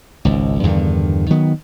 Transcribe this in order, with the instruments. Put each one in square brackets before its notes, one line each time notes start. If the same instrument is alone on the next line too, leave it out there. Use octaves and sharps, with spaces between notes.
[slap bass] G#1 C#2
E2 G2 D3 D#3
D#3 F#3 B3